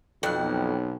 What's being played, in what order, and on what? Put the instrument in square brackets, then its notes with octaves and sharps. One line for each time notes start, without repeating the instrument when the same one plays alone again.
[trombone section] B1 [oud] F2 [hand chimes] G5 F#6